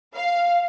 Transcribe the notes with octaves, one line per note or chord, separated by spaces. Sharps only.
F5